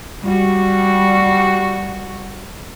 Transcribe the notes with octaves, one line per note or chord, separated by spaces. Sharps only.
G3 F#4